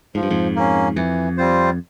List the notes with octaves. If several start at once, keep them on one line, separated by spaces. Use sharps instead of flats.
G#2 F3
G2
F2 G#2
A#3 C#4
F2 E3
G3 C4 F4 C5